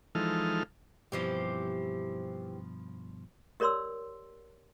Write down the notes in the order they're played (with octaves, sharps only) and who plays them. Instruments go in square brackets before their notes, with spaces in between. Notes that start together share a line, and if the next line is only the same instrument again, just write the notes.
[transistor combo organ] E3 F3 G#3 D#4 A4 F6
[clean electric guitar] G2 B2 F3 [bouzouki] E3 C4 G4
[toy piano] G4 A#4 C#5 D5 C6 E6